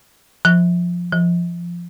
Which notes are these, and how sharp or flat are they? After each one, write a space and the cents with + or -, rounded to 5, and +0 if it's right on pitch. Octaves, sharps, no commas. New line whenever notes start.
F3 +10
F3 -15